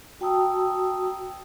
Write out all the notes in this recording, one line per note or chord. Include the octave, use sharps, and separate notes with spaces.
F#4 G5 A5 A#5 D#6 E6